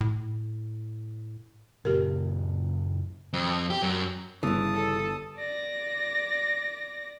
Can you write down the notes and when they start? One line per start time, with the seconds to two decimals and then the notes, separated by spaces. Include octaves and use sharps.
0.01 A2
1.85 F#2 A#2 C#3 G4 A#4
3.33 F2
3.70 G4
3.83 F#2
4.43 G1 G2 C#3 E3 A5 D#6
4.75 A4
5.37 D5 A#6